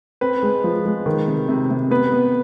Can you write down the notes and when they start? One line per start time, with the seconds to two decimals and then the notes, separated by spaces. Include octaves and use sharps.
0.21 C4 B4
0.43 G#3
0.64 F3
0.85 G#3
1.06 D#3
1.27 C3
1.48 C3
1.71 C3
1.91 B3 B4
2.12 B3